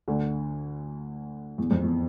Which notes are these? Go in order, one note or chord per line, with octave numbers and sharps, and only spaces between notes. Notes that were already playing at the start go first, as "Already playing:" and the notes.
D2 D3
E2
F2
E2